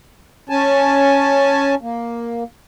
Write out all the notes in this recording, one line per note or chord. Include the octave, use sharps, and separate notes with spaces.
C#4 G#5 A5
A#3